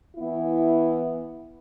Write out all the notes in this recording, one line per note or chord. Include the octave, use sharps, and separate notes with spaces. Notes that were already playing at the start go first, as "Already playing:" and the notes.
E3 B3 E4